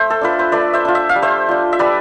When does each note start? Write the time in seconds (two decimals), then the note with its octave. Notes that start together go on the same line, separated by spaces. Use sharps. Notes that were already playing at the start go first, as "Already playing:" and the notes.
Already playing: A3 C5 E5
0.10 A4
0.21 D4 F4 B4
0.39 C5
0.52 A3 B4 D5
0.73 C5 E5
0.85 D4 F4
0.95 E5
1.09 F5
1.16 G3
1.22 C5 E5
1.49 D4 F4
1.73 E5
1.79 G3 B4 D5